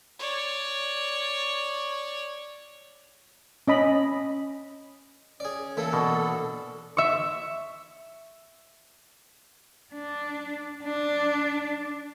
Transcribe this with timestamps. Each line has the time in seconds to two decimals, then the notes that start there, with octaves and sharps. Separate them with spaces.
0.19 C#5 D5
3.68 C#4 D#5 B5
5.40 C#4 G#4 D5
5.77 E3 A#3 A4
5.93 B2 D4
6.97 E5 C#6
9.94 D4
10.84 D4